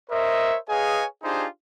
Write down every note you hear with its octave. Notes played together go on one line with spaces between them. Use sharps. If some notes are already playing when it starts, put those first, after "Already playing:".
A#4 C5 C#5 D#5 E5
G#4 B4 C#5 D#5 F5 G#5
D4 D#4 F4 G4 G#4 C5